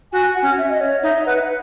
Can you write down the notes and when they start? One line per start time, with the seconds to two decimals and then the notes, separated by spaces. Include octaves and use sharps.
0.13 F#4 G#5
0.35 F#5
0.42 C#4
0.58 E5
0.69 D#5
0.81 C#5
1.03 D#4 E5
1.26 B4 F#5